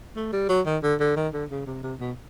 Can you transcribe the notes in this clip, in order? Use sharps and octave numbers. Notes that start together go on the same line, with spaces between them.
A3
G3
F#3
D#3
D3
D3
D#3
D3
C#3
C3
C3
B2